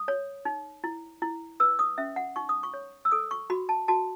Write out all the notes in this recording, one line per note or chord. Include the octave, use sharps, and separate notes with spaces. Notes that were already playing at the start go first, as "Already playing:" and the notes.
Already playing: D#6
C#5
D#4
E4
E4
B4 E6
D#6
C#4 E5
F#5
D#4 C#6
D#6
C#6
C#5
E6
A4 D#6
C#6
F#4 B5
A5
F#4 A5